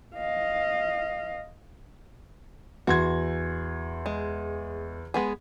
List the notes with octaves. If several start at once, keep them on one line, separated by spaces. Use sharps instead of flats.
D#5 F5
E2 F#4 C6 G#6
G#3
G#3 B3 G#4